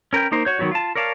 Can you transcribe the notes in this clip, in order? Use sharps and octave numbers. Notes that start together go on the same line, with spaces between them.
C#4 A#4 B4 G5
A#3 D#4 A#4 C5
F#4 C#5 G6
D#3 F#3 B3 F#4 C#5
F4 A5
A#4 C#5 D5 F5 A5